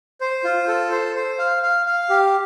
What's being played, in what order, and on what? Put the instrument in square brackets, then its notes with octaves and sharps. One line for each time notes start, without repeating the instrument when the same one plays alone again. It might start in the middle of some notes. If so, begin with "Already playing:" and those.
[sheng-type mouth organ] C5
F4
A4
C5
C5
F5
F5
F5
G4